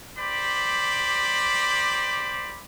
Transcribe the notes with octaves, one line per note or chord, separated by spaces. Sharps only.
G4 C5 D5 B5